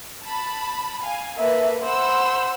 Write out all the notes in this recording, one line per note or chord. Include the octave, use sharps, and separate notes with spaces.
A5 B5
F5 G#5
A#3 A4 B4 E5
C5 F#5 B5 E6